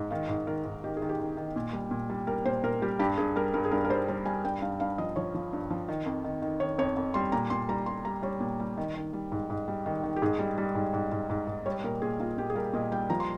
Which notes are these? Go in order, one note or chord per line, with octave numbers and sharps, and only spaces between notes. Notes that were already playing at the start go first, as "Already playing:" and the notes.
Already playing: G#2
D#3 F5
G#2
D#3 A#4
G#2
D#3 G4
G#4
D#3
G4
D#3
D#3
A#2
G3
A#2
G3
G3 A#4
A#2 C5
A#2 A#4
G3 G4
G2 G4
G2 G#4
G3 A#4
G2 A#4
G#4
G2 A#4
A#4
G3 C5
G3 C5
G3 G#5
G2 G5
G2 F5
G2 F5
F3 D#5
F3 C#5
F3
G2
F3
D#3
F2
D#3
D#3
D#3 C#5
F2 C#5
F2
G3 C6
A#2 A#5
A#2 C6
G3 A#5
G3 C6
G3 A#5
G3 C#5
A#2
G3
D#3
D#3
G3
G#2
G#2
G3
D#3
D#3
G4
G#2 G#4
G3
G3
G#2
G#2
G#2
G#2
G#2
G3 C#5
A#2 A#4
A#2 G#4
A#2 F4
A#2 G4
G#4
G3 A#4
A#2 D#5
G3 G5
F3 A#5
C6